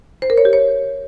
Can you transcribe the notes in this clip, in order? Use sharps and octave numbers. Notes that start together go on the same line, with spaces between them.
C5
A#4
C#5
G4
C#5